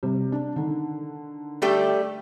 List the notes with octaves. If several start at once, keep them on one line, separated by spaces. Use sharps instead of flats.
C3 G3
D4
D3 D#3
G3 A3 G4